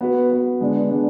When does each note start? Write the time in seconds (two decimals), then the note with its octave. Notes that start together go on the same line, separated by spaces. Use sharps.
0.01 B3 F#4 B4
0.30 B3 F#4 B4
0.61 D3 G#3 B3 D4
0.90 D3 G#3 B3 D4